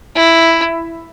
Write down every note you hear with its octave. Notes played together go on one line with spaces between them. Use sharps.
E4